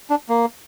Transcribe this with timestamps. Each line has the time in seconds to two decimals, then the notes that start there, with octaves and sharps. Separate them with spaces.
0.10 D4
0.29 A#3